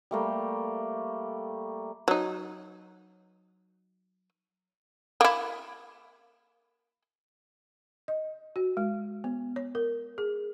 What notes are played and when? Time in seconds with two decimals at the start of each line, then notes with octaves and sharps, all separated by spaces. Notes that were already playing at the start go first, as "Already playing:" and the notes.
0.11 G3 A3 A#3
2.08 F#3 D#4
5.21 A#3 E4
8.08 D#5
8.56 F#4
8.77 G#3
9.24 B3
9.56 C#5
9.75 A#4
10.18 G#4